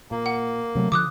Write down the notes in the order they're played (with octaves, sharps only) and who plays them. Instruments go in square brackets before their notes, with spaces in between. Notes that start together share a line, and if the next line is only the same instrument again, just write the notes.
[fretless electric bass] A#2 [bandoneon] A#3
[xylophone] F#5
[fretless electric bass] C3 F#3 A3
[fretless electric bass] D3 F3 [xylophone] D6 D#6 F#6